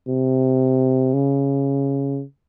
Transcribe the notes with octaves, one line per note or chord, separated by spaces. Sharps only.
C3
C#3